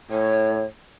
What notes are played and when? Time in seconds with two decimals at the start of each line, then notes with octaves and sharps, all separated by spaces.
0.10 A2 C#5